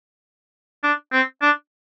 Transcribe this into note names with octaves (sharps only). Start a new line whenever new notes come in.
D4
C4
D4